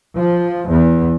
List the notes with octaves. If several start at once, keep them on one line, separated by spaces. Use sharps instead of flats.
F3
E2